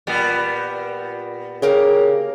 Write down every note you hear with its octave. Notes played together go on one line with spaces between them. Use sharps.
A#2 G3 B3
C#3 A#3 G4 A#4